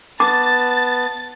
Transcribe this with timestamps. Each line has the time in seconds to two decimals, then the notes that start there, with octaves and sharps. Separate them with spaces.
0.20 B3 A5 D6 A6